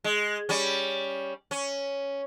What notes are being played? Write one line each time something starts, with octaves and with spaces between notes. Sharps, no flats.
G#3
G3 C#4
C#4